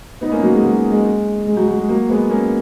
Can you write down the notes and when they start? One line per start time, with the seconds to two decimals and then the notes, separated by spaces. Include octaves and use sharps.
0.21 B3 D#4
0.32 A#3 C#4
0.42 F#3 A#3
0.52 G#3
0.63 F#3
0.91 G#3
1.47 G#3
1.57 F#3
1.68 F#3
1.78 G#3
1.89 F#3 A#3
2.09 G#3 B3
2.29 A#3 C#4